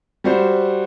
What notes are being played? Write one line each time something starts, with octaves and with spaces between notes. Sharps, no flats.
G3 F#4 C5